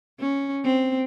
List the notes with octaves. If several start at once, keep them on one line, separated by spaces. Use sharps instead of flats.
C#4
C4